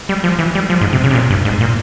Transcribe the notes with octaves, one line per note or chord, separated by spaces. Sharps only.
G3
F3
E3
G3
F3
G#2
C3
C#3
C3
A#2
G2
G#2
A#2